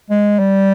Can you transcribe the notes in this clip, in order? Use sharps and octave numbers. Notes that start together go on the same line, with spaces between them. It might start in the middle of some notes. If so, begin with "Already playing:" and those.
G#3
G3